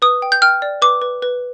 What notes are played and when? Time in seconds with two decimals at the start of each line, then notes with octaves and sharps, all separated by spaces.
0.02 B4 D#6
0.22 G5
0.32 G6
0.42 G5 F6
0.62 D5
0.82 B4 D6
1.02 B4
1.22 B4